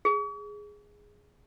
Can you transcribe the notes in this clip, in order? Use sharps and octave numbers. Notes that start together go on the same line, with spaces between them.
G#4